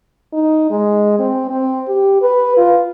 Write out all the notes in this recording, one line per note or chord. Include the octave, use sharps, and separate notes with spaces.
D#4
G#3
C4
C4
G4
B4
F4